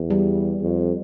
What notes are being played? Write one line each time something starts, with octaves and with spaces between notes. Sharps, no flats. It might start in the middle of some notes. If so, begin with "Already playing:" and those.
Already playing: E2
G3
F2